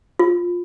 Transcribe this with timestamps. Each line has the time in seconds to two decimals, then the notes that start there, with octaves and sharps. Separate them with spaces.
0.19 F4